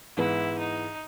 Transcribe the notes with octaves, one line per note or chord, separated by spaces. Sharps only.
G#2 E3 B3 E4
D#4